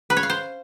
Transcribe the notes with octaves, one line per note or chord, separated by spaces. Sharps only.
B4
C#5
F5
C5